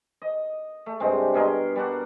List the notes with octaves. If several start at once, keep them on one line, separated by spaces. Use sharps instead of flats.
D#5
A3
G2 C3 G#3 C4
B2 G#4 A#4 C6
G3 D4 F#4